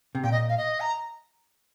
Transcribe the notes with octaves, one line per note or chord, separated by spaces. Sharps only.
C3
A#2 G5
D#5
F5
D#5
A#5